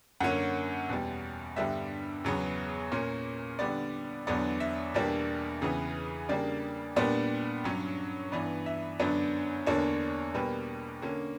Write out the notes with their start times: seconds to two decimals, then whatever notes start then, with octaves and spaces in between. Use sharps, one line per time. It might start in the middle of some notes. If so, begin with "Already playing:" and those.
0.20 F#2 D3 A#3 C#4 F#5
0.89 E2 B2 G3
1.56 G2 D3 G3 B3 E5
2.24 E2 C#3 F#3 B3
2.92 A#2 A#3 C#4
3.59 D3 G3 B3 D5
4.27 E2 D3 F#3 B3 D5
4.60 E5
4.94 E2 B2 G3 A#3 D4
5.61 E2 C#3 E3 B3
6.29 C#3 G3 A#3 D4 D5
6.96 A#2 G3 B3 D4
7.64 G2 F#3 C#4
8.32 G2 E3 B3 D5
8.66 E5
8.99 F#2 D3 F#3 B3 D4
9.66 E2 D3 A#3 D4 C#5
10.34 B2 G3 A#3 B4
11.02 D3 A#3 C#4